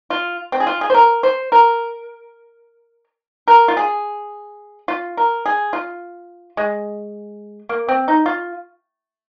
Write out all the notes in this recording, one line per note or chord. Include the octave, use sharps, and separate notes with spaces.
F4
C4
G#4
F4
G#4
C5
A#4
C5
A#4
A#4
F4
G#4
F4
A#4
G#4
F4
G#3
A#3
C4
D#4
F4